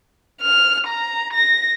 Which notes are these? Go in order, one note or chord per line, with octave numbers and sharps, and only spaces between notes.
F6
A#5
A#6